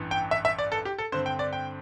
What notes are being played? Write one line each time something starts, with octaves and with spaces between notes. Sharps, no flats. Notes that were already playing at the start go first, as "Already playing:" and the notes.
Already playing: A1 G2 E3
G5
E5
E5
D5
A4
G4
A4
G2 D3 C4 C5
G5
D5
G5